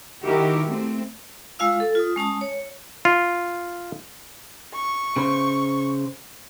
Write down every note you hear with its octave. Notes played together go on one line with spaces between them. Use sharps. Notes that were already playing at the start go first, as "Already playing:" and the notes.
D#3 E4 F#4 G4 A#4
A3 C4
G#3 F4 F5 E6
A4
F4 D#6
G#3 C#4 A5 D#6
C#5
F4
C#6
C#3 C5